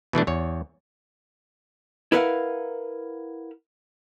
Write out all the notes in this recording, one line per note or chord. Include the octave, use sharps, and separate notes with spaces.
B2 E3 A3 D4
E2 C#5
E4 A#4 B4 F5 F#5